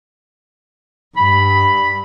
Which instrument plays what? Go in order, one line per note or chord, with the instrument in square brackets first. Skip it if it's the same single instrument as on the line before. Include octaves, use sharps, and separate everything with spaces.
[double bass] G2 [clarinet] B5